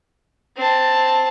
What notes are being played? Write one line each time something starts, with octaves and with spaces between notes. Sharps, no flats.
C4 A5